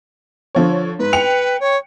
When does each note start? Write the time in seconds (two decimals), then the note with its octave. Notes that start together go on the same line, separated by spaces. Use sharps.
0.55 D3 F3 C#5
0.99 G#2 B4
1.13 G5 C#7 F7
1.60 C#5